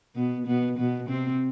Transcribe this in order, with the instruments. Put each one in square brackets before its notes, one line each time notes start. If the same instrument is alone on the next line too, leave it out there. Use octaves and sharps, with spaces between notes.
[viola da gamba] B2 B3
B2 B3
B2 B3
C3 C4